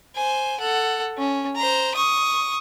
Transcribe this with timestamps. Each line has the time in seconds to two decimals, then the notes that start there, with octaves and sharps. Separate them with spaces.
0.15 C5 G#5
0.60 A4 F#5
1.17 C#4
1.56 C5 A#5
1.95 C#6 D#6